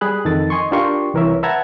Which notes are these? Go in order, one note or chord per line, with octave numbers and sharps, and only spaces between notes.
G3 G#4 B5 F#6
F2 D#3 A4 A6
D#5 G#5 C6 C#6
D4 F4 G4 A#4 C6 C#6
C2 E3 A#4 C#5 E5
B4 E5 F#5 A5 A#5 G#6